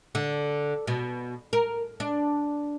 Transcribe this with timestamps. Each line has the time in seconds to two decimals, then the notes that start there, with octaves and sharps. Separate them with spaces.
0.15 D3
0.87 B2
1.53 A#4
2.00 D4